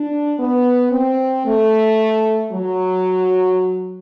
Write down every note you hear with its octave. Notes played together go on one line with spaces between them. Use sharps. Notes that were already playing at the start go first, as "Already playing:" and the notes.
Already playing: D4
B3
C4
A3
F#3